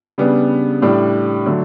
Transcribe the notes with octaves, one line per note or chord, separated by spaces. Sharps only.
C#3 G3 B3 D4
A2 G3 D4
D3 F#3 A3